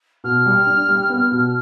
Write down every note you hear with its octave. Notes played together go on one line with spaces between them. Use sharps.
B2 F6
G3
D4
G3
B3
B2